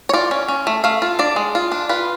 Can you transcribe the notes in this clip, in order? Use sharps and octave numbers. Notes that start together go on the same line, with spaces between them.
C#5
F4 D5
C#4
C#4
A3
A3 F5
F4
D4 D5
G#3
F4
D4
F4 B4